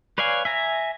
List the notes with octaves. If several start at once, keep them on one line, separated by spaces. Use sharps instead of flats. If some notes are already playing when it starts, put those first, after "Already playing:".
B4 C#5 D5 F5 G#5
E5 G#5 A#5